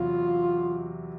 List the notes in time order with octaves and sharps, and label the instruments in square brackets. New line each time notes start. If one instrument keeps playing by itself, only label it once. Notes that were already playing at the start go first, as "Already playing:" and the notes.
Already playing: [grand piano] E2 C3 F#3 [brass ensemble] F4